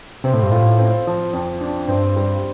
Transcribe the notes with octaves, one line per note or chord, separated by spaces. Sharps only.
C3 C4
A2
G2
A2 F4
C4
F3
F2
D4
G2 C4
G3